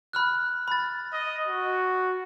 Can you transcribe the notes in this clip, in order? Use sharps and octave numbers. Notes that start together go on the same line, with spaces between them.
B5 F6 F#6
B5 A6
D#5
F#4